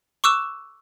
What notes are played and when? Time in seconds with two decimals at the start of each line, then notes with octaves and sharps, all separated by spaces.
0.24 C#6 D6 E6 F#6 E7